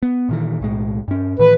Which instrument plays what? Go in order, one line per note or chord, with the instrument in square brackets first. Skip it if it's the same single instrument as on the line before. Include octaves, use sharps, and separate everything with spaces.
[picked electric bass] B3
A#2 D#3 E3
B1 A2 G#3
G2 C#4
[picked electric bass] A2 D#3 E3 [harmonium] B4